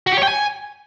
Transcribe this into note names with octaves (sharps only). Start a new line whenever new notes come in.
F#4
G4
C#5
G5
G#5